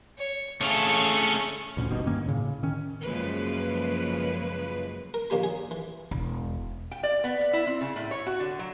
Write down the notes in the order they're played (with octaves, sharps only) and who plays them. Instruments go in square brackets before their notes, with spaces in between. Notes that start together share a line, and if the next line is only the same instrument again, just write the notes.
[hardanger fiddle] C#5
[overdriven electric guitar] A3 C#4 [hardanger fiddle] G#4 A4 [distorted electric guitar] C#5 F5
[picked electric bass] D2 A#2 D3 C#4
G#1 G2 B2 D#3
G2 D#3 A#3 C#4
A2 C#3
D#3 C#4
[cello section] F#2 C#3 F3 G#3 A#3 B4
[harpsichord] A#4
A#1 D#2 A#3 G4 B5
G#4
E3
[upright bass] E1
[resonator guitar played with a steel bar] G5
D5
B3
B3
E4
C4
C#3
A2
C#5
F#4
D3
F#3